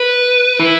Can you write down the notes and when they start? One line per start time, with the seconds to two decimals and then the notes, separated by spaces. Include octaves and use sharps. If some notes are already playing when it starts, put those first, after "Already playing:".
Already playing: B4
0.59 E4